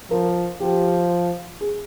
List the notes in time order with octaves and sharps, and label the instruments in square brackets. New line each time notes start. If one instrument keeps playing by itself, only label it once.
[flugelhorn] F3 [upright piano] A#4
[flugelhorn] F3 [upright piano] G4
[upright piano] G#4